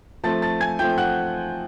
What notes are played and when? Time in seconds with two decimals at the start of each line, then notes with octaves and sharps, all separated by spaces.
0.24 F3 A3 C4 A5 A6
0.42 A5 A6
0.61 G#5 G#6
0.79 F3 A3 C4 G5 G6
0.98 F#5 F#6